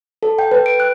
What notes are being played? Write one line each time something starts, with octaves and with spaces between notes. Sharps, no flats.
A4
G5
B4
D7
F#6